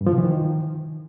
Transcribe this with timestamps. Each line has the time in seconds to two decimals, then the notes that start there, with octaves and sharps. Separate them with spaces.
0.01 G2
0.07 F3
0.12 C3
0.18 E3
0.24 D#3